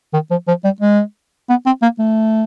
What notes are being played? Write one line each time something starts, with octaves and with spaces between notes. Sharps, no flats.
D#3
F3
F3
G3
G#3
B3
C4
A#3
A3